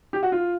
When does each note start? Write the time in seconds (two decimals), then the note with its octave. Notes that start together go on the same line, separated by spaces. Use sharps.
0.13 G4
0.23 F#4
0.32 F4